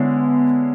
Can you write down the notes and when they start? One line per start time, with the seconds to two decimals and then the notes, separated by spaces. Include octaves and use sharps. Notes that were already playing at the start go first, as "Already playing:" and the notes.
Already playing: D3 G#3 B3 C#4 E4